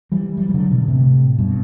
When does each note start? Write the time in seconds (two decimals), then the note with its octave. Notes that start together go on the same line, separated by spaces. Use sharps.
0.12 E3 G3
0.37 E3 G3
0.49 G3
0.54 D3 F#3
0.71 B2 D3
0.88 A2 C3
1.39 G2 B2